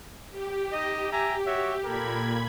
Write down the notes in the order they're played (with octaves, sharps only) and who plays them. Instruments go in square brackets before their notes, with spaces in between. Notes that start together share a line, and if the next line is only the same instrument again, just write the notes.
[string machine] G4
[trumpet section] D#4 D#5
E5 G#5 A#5
F#4 C#5 E5
[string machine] A#2 B5 G#6 [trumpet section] G4 A4 A#4